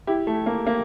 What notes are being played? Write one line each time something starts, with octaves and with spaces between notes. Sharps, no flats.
E4 G4
A3
A#3
A#3